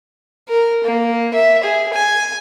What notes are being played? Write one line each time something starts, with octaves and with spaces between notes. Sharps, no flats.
A#4
A#3
E5
G#4
G#5